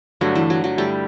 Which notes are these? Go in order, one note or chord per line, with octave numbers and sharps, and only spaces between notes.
G2 D3 F#3 A3 D4
E3
F#3
F#3
G2 D3 G3 A3 E4